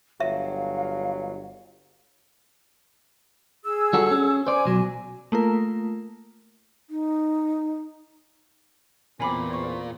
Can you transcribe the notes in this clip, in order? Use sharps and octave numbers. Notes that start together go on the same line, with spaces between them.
G1 F#3 E5 F5
G#4 E6
G3 F#4 A4
C#4
C5 D5 G#5
B1 F#3
A3 A#3 F4 A#4
D#4
E2 A#2 C4 G#5 B5 D6
C#6